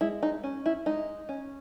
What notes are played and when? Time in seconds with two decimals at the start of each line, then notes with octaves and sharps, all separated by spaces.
0.01 G#3 E4
0.23 D#4
0.44 C#4
0.66 E4
0.86 G#3 D#4
1.29 C#4